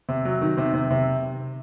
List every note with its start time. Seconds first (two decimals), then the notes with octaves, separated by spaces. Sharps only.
0.09 C3
0.25 F#3
0.41 D#3
0.57 C3
0.74 C3
0.91 C3